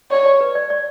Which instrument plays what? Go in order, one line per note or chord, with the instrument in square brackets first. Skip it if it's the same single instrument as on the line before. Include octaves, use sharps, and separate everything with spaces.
[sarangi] C#5 [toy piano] D5
[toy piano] D5
B4
D5
D5